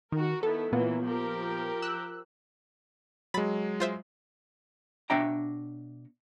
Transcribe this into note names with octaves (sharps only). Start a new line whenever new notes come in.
D#3 F#4 A#4
D#3 B3 E4 A4
A#2 E3 F#3 A#3 B3 F4
F3 G4 A#4
E6 F#6
F#3 G#3 B5 A6
F4 C5 E5
B2 D4 C#5 E5 G5 A#5